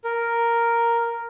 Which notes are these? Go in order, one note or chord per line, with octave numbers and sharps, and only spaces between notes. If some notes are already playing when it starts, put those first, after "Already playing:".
A#4